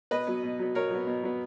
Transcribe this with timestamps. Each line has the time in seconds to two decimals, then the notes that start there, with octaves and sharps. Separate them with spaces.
0.11 B2 B4 D#5
0.27 F#3 B3
0.43 B2
0.59 F#3 B3
0.75 B2 A#4 C#5
0.91 F#3 B3
1.07 B2
1.23 F#3 B3